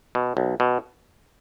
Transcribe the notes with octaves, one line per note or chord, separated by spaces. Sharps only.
B2
B1
B2